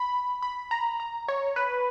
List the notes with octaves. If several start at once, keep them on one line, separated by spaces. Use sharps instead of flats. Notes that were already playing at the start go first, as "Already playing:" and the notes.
Already playing: B5
B5
A#5
A#5
C#5
B4